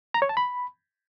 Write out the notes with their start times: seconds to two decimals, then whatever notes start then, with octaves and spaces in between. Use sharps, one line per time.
0.14 A#5
0.22 C#5
0.29 A5
0.37 B5